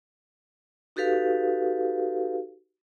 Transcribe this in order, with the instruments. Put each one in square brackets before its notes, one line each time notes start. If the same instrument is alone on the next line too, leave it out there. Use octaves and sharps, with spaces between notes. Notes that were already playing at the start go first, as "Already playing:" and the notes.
[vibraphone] D#4 F#4 G4 A4 B4 F5